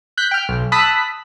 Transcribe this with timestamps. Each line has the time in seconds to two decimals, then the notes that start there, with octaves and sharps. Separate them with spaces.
0.17 F#6 G6 B6
0.31 G5 F6
0.49 B1
0.72 A5 B5 D#6 E6 F#6 B6